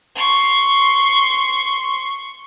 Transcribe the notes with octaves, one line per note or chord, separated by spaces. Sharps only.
C6 C#6